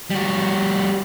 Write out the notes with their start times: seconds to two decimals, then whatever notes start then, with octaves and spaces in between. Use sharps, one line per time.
0.10 G3 F#4